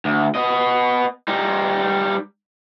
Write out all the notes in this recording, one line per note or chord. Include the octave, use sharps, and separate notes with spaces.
D2
B3 D#5
G3 D#4